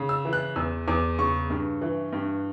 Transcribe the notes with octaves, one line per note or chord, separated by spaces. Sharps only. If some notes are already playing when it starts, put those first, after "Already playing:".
Already playing: C#3
E6
E3
F#6
E2 E6
E2 D6
C#3 C#6
G2
E3
G2